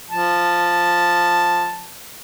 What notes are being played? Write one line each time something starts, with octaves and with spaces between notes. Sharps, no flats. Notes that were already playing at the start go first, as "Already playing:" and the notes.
F3 A5